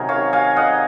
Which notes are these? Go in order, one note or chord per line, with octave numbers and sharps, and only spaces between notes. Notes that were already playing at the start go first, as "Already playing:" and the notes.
Already playing: C3 D#3 F#3 G#4 A#4
C#5 F5
F5 G#5
D#5 F#5